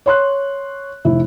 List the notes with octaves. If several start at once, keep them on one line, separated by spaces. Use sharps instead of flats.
C#5 C6 F#6
F1 E4